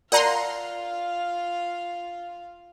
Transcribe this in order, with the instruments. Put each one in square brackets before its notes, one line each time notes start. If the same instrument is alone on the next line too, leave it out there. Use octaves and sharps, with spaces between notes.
[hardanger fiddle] F4 F5 [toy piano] A#4 D5 A5 [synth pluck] F#5 A#5 C6